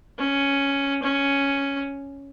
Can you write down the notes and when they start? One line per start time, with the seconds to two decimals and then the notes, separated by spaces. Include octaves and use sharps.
0.18 C#4
1.03 C#4